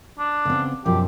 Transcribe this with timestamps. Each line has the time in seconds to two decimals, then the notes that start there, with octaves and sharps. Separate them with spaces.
0.19 D4
0.45 C#3 B3 C4
0.86 F#2 B2 F3 G4